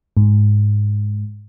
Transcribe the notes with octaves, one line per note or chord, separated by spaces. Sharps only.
G#2